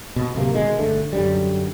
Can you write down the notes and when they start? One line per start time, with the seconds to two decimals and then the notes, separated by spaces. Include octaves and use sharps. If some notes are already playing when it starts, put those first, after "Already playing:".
0.16 B2
0.35 D1 C3 A3 A#3
0.53 B2 D#3 G#3
0.78 G1 D3 A3
1.13 F#2 D3 G3